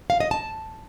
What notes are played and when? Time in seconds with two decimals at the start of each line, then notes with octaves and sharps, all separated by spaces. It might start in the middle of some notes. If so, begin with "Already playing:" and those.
0.10 F5
0.20 D#5
0.31 A5